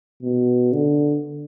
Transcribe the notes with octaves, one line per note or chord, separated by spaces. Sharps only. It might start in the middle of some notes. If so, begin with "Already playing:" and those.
B2
D3